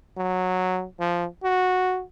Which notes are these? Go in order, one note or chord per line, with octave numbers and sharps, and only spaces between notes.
F#3
F3
F#4